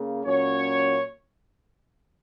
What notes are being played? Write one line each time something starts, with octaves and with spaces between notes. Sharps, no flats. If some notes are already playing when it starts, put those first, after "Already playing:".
Already playing: C#3 A#3
A#2 F#3 C#4 C#5